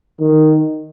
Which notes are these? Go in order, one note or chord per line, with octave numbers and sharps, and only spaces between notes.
D#3